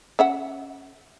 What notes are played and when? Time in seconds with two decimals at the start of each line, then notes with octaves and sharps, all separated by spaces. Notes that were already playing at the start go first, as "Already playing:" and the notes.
0.19 C#4 E5 F#5